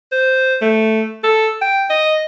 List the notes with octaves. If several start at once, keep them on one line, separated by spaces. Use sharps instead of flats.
C5
A3
A4
G5
D#5